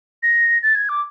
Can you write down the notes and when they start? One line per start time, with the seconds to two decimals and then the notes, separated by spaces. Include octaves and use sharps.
0.23 A#6
0.63 A6
0.75 G#6
0.89 D6